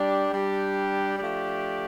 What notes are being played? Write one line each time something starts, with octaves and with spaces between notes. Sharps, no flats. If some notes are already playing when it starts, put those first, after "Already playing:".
Already playing: G3 D4 G4
G3 D4 G4
F3 A3 D4 G4